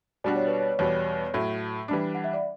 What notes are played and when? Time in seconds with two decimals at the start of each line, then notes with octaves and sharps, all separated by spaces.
0.24 B2 G3 D4 F#4 D5
0.36 C#5
0.47 B4
0.59 C#5
0.79 E2 B2 G3 B3 C#5
1.34 A2 F#3 A3
1.88 E3 G3 D4
2.15 F#5
2.24 E5
2.34 D5